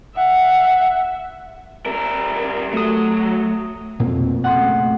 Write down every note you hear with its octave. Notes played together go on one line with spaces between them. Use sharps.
E5 F#5
G3 A#4
F#3 A3 D#6
F1 F2 B2 A#3 C4
F#2 C#3 A3 F#5 C6